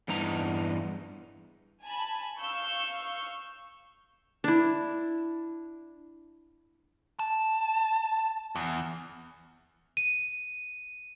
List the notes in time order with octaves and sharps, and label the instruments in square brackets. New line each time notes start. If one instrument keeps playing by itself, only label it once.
[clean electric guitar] E2 G2 D#4 A#5
[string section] G#5 A5 B5
F5 C#6 E6 G6
[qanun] D4 E4
[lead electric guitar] A5
E2
[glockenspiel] D#7